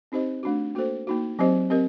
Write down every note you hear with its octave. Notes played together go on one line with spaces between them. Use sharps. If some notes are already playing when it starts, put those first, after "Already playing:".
C4 D#4 G4 C5 D#5
A3 D4 F#4
A#3 F#4 A4 C5
A#3 D#4 F#4
F#3 C4 G4 C5 D#5
C4 G4 A#4 D#5